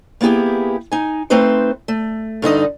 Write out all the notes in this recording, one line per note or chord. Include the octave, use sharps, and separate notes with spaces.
A#3 B3 E4 G4 G#4
D#4 G#5
A3 C4 D#4 B4 C5
A3
G2 D3 D#4 D#5